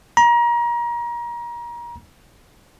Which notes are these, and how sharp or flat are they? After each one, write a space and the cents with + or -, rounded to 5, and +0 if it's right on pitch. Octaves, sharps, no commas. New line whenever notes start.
A#5 +30